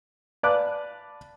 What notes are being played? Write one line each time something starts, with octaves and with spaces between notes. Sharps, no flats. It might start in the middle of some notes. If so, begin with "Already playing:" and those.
B4 D5 F5 A5 D6 F#6